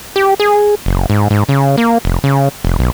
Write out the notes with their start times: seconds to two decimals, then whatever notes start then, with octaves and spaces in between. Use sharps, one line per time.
0.16 G4
0.40 G#4
0.86 F#1
1.10 G#2
1.30 G#2
1.49 C#3
1.78 A#3
2.05 F1
2.24 C#3
2.65 F1
2.79 B1